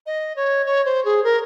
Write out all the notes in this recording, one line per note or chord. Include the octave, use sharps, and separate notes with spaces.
D#5
C#5
C#5
C5
G#4
A#4